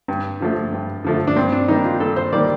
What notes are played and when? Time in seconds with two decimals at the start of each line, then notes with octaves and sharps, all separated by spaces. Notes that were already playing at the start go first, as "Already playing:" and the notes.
0.08 G2
0.41 D3 F3 A3
0.72 G2
1.04 D3 F3 A3
1.27 D4
1.36 G2 C4
1.52 D4
1.68 D#3 G3 A#3 D#4
1.84 F4
2.00 G2 A4
2.16 C5
2.33 D#3 G3 A#3 D5